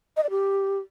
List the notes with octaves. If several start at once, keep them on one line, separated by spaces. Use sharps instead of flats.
D#5
D5
G4